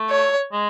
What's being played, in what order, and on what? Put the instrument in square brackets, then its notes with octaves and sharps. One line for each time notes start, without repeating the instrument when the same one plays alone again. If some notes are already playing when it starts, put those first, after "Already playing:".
Already playing: [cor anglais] A3
[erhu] C#5
[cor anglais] G#3